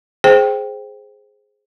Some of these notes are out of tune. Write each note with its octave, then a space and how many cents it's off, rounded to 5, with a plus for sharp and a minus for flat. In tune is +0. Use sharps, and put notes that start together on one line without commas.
G#4 +5 C5 +0 G5 +0